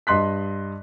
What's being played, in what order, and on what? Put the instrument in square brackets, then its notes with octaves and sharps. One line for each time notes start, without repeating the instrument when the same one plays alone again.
[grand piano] G2 D#5 C6 F#6 B6